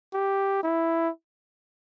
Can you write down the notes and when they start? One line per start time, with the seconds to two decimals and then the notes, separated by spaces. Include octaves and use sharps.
0.14 G4
0.63 E4